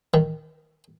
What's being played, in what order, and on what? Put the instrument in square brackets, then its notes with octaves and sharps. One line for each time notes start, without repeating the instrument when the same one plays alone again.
[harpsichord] D#3